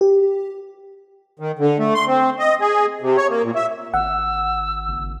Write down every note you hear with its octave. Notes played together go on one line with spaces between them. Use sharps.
G4
D#3
D3
A3
C6
C4
D#5
G#4
C3
C#5
A#3
A#2
E5
G#1 F#5 E6
F#1